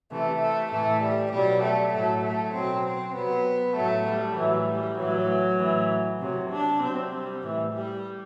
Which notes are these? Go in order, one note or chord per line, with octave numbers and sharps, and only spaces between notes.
C3 E3 A3
A3
A2 E3 A3
G3
B2 F#3 G3
A3
A2 F#3 A3
A3
B2 F#3 C4
C4
C3 F#3 B3
A2 F#3 A3
G3
A2 E3 F#3
G3
A2 E3 F#3
A2 E3
C3 F#3
D4
C3 F#3 C4
G3
A2 E3
G3